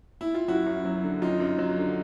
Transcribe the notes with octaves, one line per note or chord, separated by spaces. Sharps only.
E4
F4
F#2 E4 F#4
F#2
F#3
D3
F#2 D#4 F4
F#2
F#3
D3